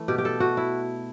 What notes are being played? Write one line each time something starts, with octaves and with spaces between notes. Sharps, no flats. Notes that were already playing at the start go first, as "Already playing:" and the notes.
Already playing: E3 A3
B2 G4
G4
A4
A3 F#4
E4